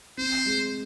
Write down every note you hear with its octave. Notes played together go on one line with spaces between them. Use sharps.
C4 C5
G#3